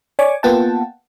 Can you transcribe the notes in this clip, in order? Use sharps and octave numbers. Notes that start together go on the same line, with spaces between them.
C#5 D5 G#5 C#6 D6
A#3 B3 F4 F#5 G5 A5